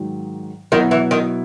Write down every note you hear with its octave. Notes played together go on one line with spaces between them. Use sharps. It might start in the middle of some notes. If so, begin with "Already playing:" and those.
Already playing: G#2 D#3 F#3
B2 D#3 F#3 B3 E4
E3
D#3